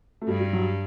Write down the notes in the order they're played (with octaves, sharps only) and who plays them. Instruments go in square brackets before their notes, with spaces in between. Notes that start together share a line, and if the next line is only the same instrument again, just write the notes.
[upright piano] A3
[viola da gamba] G2 [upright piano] G3
[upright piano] G3
F#3